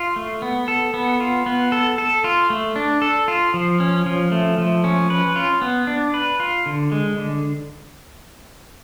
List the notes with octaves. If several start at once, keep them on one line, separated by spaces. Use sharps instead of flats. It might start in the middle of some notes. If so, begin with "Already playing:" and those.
Already playing: F4
A3
B3
A4
B3
F4
B3
A4
A4
F4
A3
D4
A4
F4
F3
C#4
F3
A3
F3
C#4
B4
F4
B3
D4
B4
F4
D3
G#3
D3